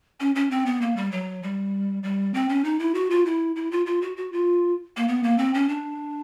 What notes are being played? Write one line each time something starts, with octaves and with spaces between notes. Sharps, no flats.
C#4
C#4
C4
B3
A#3
G3
F#3
G3
G3
C4
C#4
D#4
E4
F#4
F4
E4
E4
F4
F4
F#4
F#4
F4
A#3
B3
A#3
C4
C#4
D4